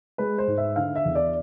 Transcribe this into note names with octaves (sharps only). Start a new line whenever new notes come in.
G#3 B4
C5
G#2
E5
D3 F5
E5
E2
D5